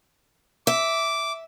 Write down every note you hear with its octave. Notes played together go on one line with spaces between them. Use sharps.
E5 D6